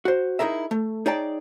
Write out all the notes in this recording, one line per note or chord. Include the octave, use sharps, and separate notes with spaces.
F#4 C5
D#4 E4 G#4 A#4 E5
A3
D#4 G#4 C#5 D5 G5 A5